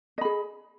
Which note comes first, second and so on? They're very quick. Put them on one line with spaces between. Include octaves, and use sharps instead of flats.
D#5 B5 G#4